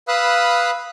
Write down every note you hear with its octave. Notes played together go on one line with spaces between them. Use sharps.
B4 F5 B5 D#6 E6 F#6